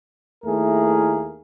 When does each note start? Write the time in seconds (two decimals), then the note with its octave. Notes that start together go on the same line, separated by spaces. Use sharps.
0.44 D#2 A3 E4 G#4 A#4